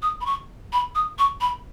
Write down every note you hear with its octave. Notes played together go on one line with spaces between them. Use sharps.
D#6
B5
C#6
B5
D#6
C#6
B5